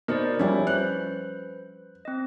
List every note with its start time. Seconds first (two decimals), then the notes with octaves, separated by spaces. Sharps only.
0.08 B2 D#4 A#4 C5 D5
0.40 F3 G3 C#4 D4 E4 G5
0.67 B4 C5 F#6
2.05 C4 D#5